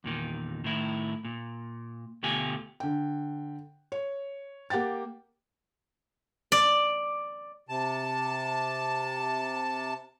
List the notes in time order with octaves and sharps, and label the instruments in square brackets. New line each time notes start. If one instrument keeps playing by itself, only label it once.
[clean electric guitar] E2 A#2 D#3
A2 D#3 E4
A#2
D2 B2 A3 F4 G4 G#5
[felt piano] D3 G5
C#5
A#3 G4 F#5 G5 A6
[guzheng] D5
[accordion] C3 A5